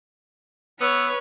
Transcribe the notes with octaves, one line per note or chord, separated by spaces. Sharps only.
B3 B4 C#5 E6